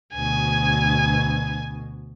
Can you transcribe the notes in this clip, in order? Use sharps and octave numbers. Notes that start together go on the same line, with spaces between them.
D2 B2 G#5